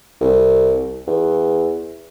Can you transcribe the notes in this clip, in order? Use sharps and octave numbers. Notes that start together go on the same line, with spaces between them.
C2
E2